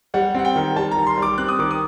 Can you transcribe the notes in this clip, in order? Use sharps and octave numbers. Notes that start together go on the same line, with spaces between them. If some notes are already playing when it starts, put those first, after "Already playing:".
G3 F#5
C4 F#5
G5
D#3
G3 A5
A#5
D#3
C6
G3 D6
C4 F#6
D#6
D#3 D6
D#6